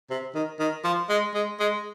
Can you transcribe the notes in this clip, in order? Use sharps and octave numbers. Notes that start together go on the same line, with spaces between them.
C3
D#3
D#3
F3
G#3
G#3
G#3